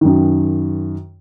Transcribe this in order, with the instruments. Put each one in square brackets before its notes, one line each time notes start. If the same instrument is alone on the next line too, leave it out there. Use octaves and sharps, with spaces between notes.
[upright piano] F#2 D#3